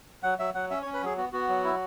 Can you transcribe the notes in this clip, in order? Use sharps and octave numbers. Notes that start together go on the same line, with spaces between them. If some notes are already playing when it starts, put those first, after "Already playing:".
F#3 F#5
F#3 E5
F#3 F#5
C#4 E5
C#5
C#4
B4
F#3 G#4
B3 F#4
B3 F#4
F#3
E4